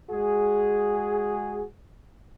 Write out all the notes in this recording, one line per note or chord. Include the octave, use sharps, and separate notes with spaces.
G#3 F#4 G#4